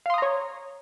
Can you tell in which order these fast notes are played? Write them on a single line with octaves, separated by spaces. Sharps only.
F5 C6 D#6 A#5 C#5